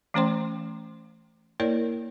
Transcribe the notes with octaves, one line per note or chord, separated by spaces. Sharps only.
E3 A3 C#4 C5 G5 C6
A#3 E4 A#4 C#5 D5